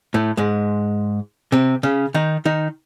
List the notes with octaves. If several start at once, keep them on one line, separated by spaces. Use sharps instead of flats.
A2 A3
G#2 G#3
C3 C4
C#3 C#4
D#3 D#4
D#3 D#4